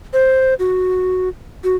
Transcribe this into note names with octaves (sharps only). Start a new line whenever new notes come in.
C5
F#4
F#4